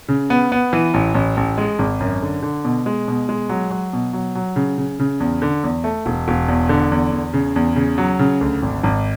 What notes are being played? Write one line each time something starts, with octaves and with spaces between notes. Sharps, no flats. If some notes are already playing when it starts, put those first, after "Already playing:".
C#3
B3
B3
E3
A1
A1
A1
G#3
G#1
F#2
D3
D3
B2
G#3
B2
G#3
F#3
F#3
B2
F#3
F#3
C#3
C#3
C#3
E2
D3
E2
A3
E1
E1
E2
D3
E2
E2
C#3
E2
C#3
F#3
C#3
D2
G#1
G#1